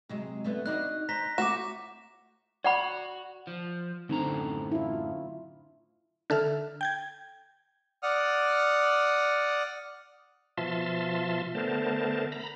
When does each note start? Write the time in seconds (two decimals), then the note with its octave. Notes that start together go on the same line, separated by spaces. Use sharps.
0.09 C3 F#3 G#3
0.44 D3 A3 B3
0.66 D4 D#4 F#4 F#6
1.09 C5 A#5 A#6 B6
1.38 A3 C4 F#4 D6 E7
2.64 F#4 D5 F#5 B5
3.47 F3
4.09 F#2 A2 D3 C4 D#4 A#5
4.72 E4 F4
6.30 D3 A4 E5 F6
6.81 G5 G6 G#6
8.03 D5 F#5 D#6 F6
10.58 B2 F3 F4 E5 A5 C6
11.55 D3 A3 B3 A#4 C5 A5
12.32 A#5 B5